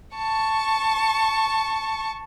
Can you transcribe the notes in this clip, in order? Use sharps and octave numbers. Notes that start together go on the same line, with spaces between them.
A5 C#6